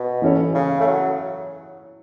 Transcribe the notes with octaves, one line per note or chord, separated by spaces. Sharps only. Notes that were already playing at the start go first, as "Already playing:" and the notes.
Already playing: B2
E3 C#4 A4 C#5
C#3
A3
F#3